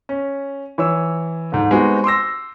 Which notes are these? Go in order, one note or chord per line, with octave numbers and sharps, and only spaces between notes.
C#4
E3 C#5 E6
D2 G#2
G#3 B3 C4 D#4 F#4 G4
C6 D6 E6 A#6